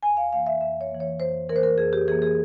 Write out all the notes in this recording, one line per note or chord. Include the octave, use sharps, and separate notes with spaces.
F2 G#5
F5
E3 A#3 F5
E5
F2 E5
C#5
E3 A#3
C#5
F2 C5
E3 A#3 A#4 C5
A#4
F2 G#4
G4
E3 A#3 G#4
G#4